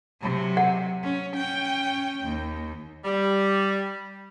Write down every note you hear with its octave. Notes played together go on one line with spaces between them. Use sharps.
C3 F#3
F#5
C#4
C#4 G5
D#2
G3